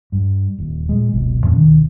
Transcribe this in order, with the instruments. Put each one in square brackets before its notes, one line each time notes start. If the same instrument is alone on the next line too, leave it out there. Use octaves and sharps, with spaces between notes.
[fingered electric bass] G2
D#1
A#2 G#3
F#1 C#2 B2
F2 A#2 F3 C#4
D1 B2 D#3